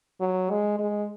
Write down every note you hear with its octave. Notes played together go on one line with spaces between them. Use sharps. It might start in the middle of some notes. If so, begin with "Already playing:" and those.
F#3
G#3
G#3